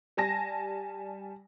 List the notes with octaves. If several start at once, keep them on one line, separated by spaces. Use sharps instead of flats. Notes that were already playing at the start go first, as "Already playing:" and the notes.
G3 G#5 A5 A#6